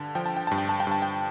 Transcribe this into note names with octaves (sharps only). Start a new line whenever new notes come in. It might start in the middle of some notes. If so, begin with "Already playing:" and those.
Already playing: G2 D3 A5
F3 G5
A5
G5
G2 A5
G5
A5
G5
G2 A5
G5